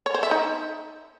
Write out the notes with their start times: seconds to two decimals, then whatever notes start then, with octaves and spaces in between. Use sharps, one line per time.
0.06 C#5
0.14 C5
0.23 E5
0.31 D#4